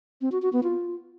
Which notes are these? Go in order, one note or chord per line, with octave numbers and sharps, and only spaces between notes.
C4
F#4
F#4
B3
F4